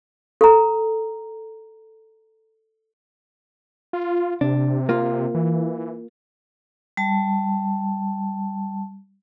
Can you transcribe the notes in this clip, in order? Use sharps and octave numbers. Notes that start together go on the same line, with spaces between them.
A4 A#5
F4
C3 D4
A#3 F4
E3
G3 A5